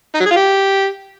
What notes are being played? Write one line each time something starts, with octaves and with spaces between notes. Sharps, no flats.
D#4
F#3
G#4
F4
G4